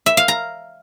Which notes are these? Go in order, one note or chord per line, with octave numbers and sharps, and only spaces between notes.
E5
F5
A#5